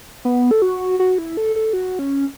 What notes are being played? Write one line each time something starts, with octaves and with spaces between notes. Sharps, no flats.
B3
A4
F#4
F#4
E4
A4
A4
F#4
C#4